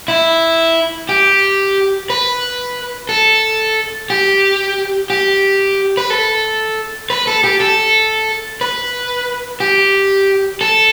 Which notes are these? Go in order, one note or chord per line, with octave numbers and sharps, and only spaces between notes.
E4
G4
B4
A4
G4
G4
B4
A4
B4
A4
G4
A4
B4
G4
A4